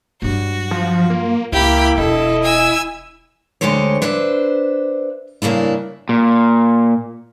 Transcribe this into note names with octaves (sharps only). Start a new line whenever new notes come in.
G2 F#3 F#4
F3 F4
A#3
C#2 A#3 E4 G4 B5
E1 A4 D#5
G#5 E6
D2 D3 G#3 G4 C5 C#5
D4 B4 C5 E5
G2 C#3 A#3 D4 E4
A#2